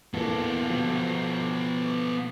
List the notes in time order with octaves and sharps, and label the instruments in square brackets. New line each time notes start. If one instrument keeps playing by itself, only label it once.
[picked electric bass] E2 A#2 [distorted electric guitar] B3 A4
[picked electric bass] B2 F3